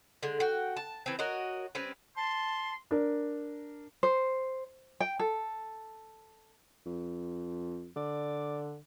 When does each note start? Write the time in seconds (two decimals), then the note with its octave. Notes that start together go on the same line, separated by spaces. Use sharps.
0.23 D3 G#3
0.40 F#4 G5
0.77 A5
1.06 E3 C4
1.19 F#4 A#4 C#5 D#5
1.75 G3 C4 C#4 B4
2.16 A5 C6
2.91 D4 A#4
4.03 C5
5.00 G5
5.19 A4
6.86 F2
7.96 D3 D5